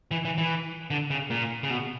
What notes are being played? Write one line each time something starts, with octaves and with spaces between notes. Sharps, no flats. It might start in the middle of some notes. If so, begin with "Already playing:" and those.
E3
E3
E3
D3
C#3
A#2
C#3
B2